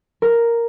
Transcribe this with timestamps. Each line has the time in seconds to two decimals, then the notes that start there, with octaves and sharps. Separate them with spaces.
0.22 A#4